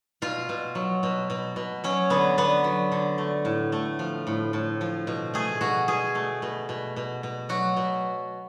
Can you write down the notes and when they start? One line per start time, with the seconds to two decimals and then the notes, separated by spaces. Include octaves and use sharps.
0.22 B2 F4
0.49 B2
0.75 F#3
1.03 B2
1.30 B2
1.56 B2
1.84 F#3 C#4
2.10 D3 B3
2.38 D3 B3
2.64 F#3
2.92 D3
3.18 A3
3.45 A2
3.72 A3
3.99 F3
4.27 A2
4.53 A2
4.81 F3
5.07 B2
5.34 A3 G#4
5.61 B2 F#4
5.88 B2 G#4
6.15 A3
6.42 B2
6.69 B2
6.96 B2
7.23 B2
7.49 F#3 F#4
7.77 B2